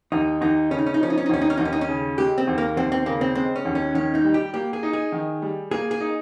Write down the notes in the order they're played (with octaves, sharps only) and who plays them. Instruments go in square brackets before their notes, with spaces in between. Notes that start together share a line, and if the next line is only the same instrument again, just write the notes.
[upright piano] D#2 [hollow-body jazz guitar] D#4
[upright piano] D#2 [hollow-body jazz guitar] D#4
[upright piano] C#3 [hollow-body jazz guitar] C#4
[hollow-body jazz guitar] D#4
C#4
D#4
[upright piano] F3 [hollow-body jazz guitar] C#4
[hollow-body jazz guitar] D#4
C#4
D#4
[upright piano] D#2 [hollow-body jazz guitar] C#4
[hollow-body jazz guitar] D#4
C#4
[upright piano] D#2 [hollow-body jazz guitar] D#4
[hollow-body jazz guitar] C#4
D#4
C#4
[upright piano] C#3
[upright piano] G#3 [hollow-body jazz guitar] G4
[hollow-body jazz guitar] C4
[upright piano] D#2
[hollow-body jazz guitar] A#3
[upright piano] D#2 [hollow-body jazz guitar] C4
[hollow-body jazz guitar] C4
[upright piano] C#3 [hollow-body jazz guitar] A#3
[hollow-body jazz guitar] C4
[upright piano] G#3 [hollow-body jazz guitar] C4
[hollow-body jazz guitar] C#4
[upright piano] D#2
[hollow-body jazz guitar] C#4
[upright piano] D#3 [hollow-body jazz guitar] C#4
[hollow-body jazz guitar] D#4
[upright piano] G3
[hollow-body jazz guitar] G4
[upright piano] A#3 [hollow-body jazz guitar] G4
[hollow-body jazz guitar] G#4
[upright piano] D#4
[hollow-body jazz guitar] G#4
[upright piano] D#3
G3
[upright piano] A#3 [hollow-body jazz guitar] G#4
[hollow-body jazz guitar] G#4
[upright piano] D#4